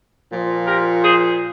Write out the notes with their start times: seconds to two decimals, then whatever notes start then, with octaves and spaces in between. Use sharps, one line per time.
0.30 A#2 F3
0.66 G4 A#4
1.03 G#4 C5